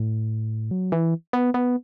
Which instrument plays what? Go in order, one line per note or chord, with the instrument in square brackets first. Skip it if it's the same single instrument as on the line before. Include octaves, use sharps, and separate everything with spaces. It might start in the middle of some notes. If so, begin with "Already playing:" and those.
Already playing: [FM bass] A2
F#3
E3
B3
B3